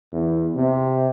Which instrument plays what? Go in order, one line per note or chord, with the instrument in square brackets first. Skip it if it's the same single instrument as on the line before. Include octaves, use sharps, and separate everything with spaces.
[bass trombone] E2
C3